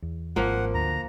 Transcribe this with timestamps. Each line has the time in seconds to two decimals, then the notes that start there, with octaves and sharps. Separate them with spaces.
0.02 E2
0.36 G#1 F3 A#3 F#5
0.74 D2 A#5